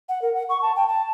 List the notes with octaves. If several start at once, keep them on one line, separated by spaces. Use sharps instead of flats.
F#5
A#4
F#5
C#6
A5
G5
A5